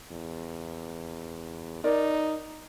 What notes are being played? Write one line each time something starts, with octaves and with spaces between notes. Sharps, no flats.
E2
D#4 A#4 D5